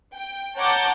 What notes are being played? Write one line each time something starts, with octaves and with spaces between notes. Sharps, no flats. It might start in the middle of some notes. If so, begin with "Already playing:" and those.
G5
C#5 F#5 A5 A#5 D6 G6